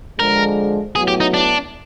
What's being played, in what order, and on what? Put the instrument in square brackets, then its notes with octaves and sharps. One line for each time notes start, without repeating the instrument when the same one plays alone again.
[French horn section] D3 F3 G#3 [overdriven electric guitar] A#4
[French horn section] A2 F#3 B3 [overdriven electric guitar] G#4
[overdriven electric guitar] G4
D#4
D4